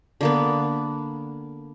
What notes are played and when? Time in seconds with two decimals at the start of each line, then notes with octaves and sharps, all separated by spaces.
0.21 D3 A#3 B3